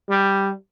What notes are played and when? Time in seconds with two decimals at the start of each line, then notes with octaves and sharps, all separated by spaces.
0.09 G3